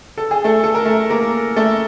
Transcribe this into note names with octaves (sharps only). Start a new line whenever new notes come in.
A4
G#4
A3 A4
A4
A#4
A3 A4
A#3 A#4
A3 A4